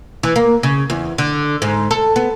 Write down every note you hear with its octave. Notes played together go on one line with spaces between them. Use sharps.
E3
A#3
C#3
E2
D3
G#2
A4
B3